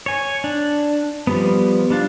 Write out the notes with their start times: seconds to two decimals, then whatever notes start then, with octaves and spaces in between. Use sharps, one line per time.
0.06 C#5 G#5
0.44 D4
1.27 F3 G3 B3
1.90 G3 D4 F4